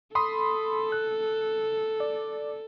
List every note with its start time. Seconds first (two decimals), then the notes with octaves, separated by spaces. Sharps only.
0.15 A4 B5 C6 D#6
0.92 F#6
2.00 D5